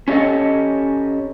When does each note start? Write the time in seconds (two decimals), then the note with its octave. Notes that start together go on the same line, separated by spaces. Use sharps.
0.08 C#4 D4 G4 A4 C#5 D#5